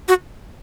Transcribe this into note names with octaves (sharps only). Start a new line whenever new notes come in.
F#4